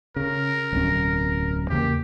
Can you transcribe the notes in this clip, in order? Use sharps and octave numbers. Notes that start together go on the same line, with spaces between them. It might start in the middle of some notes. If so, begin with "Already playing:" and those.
C#3 A#4
D1 B1 C#4
E2 C#3 A#3 G4